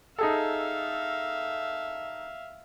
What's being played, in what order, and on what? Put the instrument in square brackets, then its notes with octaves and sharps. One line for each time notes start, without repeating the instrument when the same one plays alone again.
[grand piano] D#4 G#4 A4 [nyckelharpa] E5 F5